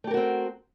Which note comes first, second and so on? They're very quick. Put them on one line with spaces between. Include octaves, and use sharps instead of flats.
A3 G4 A#4 F#4 C4